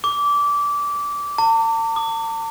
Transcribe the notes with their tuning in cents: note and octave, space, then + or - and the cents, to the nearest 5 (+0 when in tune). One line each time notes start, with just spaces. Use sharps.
D6 -20
A5 +45
D6 +45